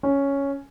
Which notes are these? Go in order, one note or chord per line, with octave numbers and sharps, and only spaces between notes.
C#4